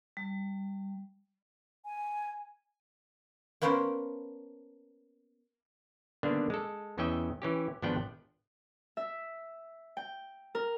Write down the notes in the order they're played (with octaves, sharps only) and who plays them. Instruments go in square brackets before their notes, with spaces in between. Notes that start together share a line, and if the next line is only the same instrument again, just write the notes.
[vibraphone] G3
[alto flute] G#5
[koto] A#3 B3 C#4 A4 A#4 C5
[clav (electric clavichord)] D3 D#3 G3 A#3 B3 D4
G#3 A4
E2 E3 C#4 D#5 E5 G5
E3 C#4 G4
G#1 F3 B3 D4 F#5 G5
[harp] E5
G5
A#4